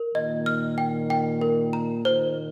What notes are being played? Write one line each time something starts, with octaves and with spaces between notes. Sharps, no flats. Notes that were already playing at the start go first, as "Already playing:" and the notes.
Already playing: A#4
A#2 D#3 D#5
F6
G5
G5
A#4
A#5
A#2 D#3 C5